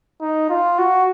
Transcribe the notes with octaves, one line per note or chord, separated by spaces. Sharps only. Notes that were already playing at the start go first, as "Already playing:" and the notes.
D#4
F4
F#4